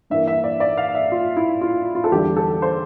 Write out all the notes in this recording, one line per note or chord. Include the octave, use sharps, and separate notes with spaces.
G2 E3 A#3 E5
E5
D5
D5
F5
E5
F4
E4
F4
F4
A4
E2 D3 G3 G4
A4
C5